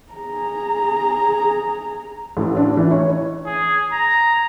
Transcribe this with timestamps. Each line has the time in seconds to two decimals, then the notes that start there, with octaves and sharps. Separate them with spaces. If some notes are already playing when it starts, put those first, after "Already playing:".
0.12 G#4 A#5
2.37 A1
2.57 D4
2.77 E3
2.91 C#5
3.46 G#4
3.92 A#5